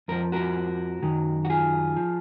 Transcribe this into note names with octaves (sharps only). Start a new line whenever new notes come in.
F2 F3 A#4
F#4 A#4
F#2 D#3 F#3
F#4
F4 G#4
F3